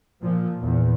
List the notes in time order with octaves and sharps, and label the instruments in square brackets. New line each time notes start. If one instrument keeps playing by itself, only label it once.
[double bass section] A#2 F3
E2 A#2